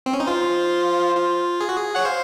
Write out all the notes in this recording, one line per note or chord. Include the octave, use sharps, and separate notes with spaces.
C4
C#4
D#4
F4 C5
F4
G#4
F#4
G#4
C#5 F#5
C5 F5